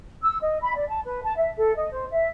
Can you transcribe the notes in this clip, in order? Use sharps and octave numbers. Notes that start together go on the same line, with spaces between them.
E6
D#5
B5
D5
A5
B4
A5
E5
A4
D#5
C5
E5